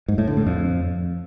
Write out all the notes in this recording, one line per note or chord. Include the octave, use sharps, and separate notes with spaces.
G#2
A2
D3
A2
F2